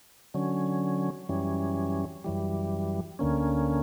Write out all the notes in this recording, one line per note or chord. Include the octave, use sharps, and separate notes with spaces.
D3 F#3 C#4
F#2 E3 G3 C#4
F#2 E3 G3
D2 D3 A#3 C#4